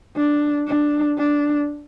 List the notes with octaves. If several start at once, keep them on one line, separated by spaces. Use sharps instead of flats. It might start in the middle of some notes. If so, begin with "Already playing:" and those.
D4
D4
D4